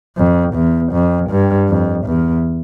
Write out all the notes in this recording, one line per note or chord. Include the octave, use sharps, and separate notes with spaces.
F2
E2
F2
G2
F2
E2